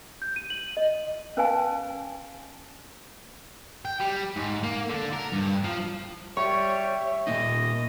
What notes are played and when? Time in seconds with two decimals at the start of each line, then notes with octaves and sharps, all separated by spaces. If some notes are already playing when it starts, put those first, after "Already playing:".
0.22 G6
0.36 D#7
0.50 F#7
0.77 D#5
1.37 C#4 B4 F5 G#5 A5
3.85 G5
4.00 G3
4.36 G#2
4.63 A#3
4.89 D3
5.13 A#4
5.33 G2
5.64 F3
6.37 G3 C#5 E5 C#6
7.27 A#2 A#3 D#4 D#5